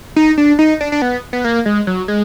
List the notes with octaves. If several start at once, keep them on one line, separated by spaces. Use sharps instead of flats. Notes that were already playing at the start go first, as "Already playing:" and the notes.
D#4
D4
D#4
D4
D4
B3
B3
A#3
G#3
F#3
G#3